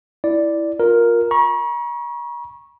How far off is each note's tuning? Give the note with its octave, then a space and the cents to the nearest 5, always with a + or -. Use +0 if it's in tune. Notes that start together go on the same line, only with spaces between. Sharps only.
E4 +0 D5 +0
F4 +20 A#4 +5
A#5 +45 C#6 -10